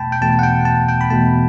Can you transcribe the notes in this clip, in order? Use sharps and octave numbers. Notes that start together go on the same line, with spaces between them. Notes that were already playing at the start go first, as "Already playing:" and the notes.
Already playing: E2 B2 A3 G5 A5 B5
G5
E2 B2 A3 A5
F#5
G5
A5
G5
B5
E2 B2 A3 A5